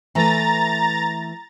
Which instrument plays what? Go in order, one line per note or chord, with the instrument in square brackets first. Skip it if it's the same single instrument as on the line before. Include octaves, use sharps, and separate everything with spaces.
[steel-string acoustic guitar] E3 A3 B4 [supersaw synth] A#5 A6